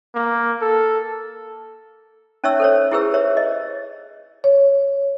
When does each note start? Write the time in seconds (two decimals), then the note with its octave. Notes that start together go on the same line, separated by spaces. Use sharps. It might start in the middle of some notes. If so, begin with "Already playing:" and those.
0.15 A#3
0.61 A4
2.44 C#4 D#4 C#5 E5 C#6 E6
2.60 A4 C5 C#5
2.91 E4 G4 G#4 B4 E6
3.14 C5 C#5 E5
3.37 D#5
4.44 C#5